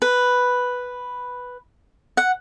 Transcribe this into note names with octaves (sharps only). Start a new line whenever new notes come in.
B4
F#5